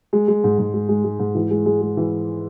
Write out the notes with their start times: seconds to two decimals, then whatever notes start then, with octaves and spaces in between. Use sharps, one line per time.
0.13 G#3
0.28 G#3
0.44 G#2
0.58 G#2
0.74 G#3
0.89 G#3
1.04 G#3
1.19 G#2
1.35 E3
1.51 G#3
1.66 G#3
1.81 G#3
1.97 E3